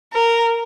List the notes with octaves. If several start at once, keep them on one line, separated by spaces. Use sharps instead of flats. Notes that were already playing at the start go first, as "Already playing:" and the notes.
A#4